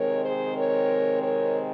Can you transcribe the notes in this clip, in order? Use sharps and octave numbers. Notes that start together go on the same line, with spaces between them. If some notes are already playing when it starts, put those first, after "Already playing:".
Already playing: C3 D#3 G#3 C4 A#4 C#5
G#4 C5
A#4 C#5
A#4 C#5